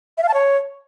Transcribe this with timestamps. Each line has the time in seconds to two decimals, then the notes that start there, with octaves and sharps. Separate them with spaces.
0.18 E5
0.23 F5
0.28 A5
0.34 C#5